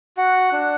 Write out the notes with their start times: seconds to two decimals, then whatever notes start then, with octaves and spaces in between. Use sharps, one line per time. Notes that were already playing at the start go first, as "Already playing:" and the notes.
0.17 F#4 F#5
0.52 D4